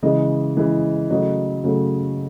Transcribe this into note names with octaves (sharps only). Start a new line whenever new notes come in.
C#3 E3 G#3 D#5
C#3 E3 G#3
C#3 F#3 A3 D#5
C#3 F#3 A3